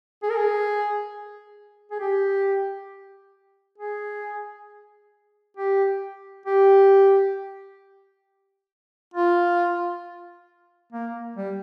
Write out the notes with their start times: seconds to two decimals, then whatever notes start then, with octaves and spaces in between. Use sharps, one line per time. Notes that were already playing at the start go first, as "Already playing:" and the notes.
0.23 G#4
0.30 A#4
0.37 G#4
1.91 G#4
2.00 G4
3.78 G#4
5.57 G4
6.46 G4
9.14 F4
10.92 A#3
11.36 G3